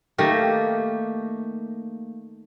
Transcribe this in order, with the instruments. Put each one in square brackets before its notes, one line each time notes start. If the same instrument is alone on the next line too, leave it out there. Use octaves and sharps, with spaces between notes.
[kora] D#3 A3 A#3 G4